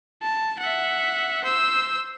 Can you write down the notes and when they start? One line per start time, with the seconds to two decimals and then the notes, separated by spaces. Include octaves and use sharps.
0.22 A5
0.59 E5 F#5
1.44 C5 E6